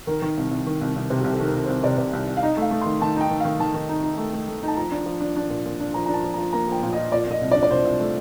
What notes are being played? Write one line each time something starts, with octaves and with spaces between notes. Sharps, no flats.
D#3 A#4
D#3
C2
C2
D#3
C2
C2
C3
C2 G4
A4
D#3 A#4
C2
C5
C2
C3 D5
C3
C2
C2
F5
D#4 D#5
A3 F5
A3
C6
D#3
D#3 A5
D#4 G5
D#3
F5
D#3
D#3 A5
D#3
D#4
D#4
A3
A3
A3
D#4
A5
F3 A#5
D4
F3
D4
D4
A#2
A#2
D4
F3 A#5
D4 A#5
A5
F3
A#5
F3
A#3 A#5
F3 G5
A#2
D#5
F3
A#2 D5
A#2 D#5
C2
D5
D4
D5
C2 C5
C2
A3